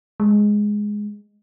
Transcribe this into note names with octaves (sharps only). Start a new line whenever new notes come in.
G#3